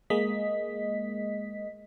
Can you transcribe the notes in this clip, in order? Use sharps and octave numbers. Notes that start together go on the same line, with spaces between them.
G#3 A#3 D#5 B6